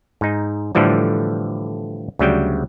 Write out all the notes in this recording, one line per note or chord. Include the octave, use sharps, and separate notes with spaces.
G#2 D#4
A2 D3 E3 F3 G3
D2 C#3 F#3 G3 G5